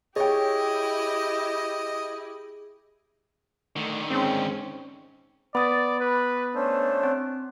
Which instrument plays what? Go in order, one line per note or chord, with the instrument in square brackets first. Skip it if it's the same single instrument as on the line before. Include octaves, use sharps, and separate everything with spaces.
[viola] E4 G4 [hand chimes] G#4 [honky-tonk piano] C#5 G5 [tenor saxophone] D#5
[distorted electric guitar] D3 D#3 [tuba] A3
[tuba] G#2 [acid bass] C4 [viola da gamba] C#4
[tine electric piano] B3 [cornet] D5 [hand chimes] B5 D#6 A6
[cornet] B4
[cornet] A3 [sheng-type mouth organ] C#4 D4 C5
[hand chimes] C4